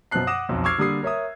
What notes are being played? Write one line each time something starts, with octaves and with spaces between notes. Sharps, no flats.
F#2 B2 F3 A5 F#6 C7
F#5 D6 D#6 A#6 E7
B1 F2
C#6 D6 E6 F6 G#6 C7
D3 G3 A#3 D#6 C7
A#4 C#5 E5 D#6